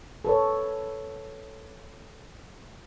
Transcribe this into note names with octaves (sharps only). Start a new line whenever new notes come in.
A4 B4 C#5